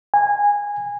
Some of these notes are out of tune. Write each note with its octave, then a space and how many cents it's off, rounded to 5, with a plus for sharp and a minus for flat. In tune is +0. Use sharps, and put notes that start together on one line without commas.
G#5 -20